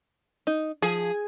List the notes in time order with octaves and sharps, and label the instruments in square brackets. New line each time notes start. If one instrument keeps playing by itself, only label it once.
[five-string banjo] D#4
[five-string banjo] F3 [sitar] G#4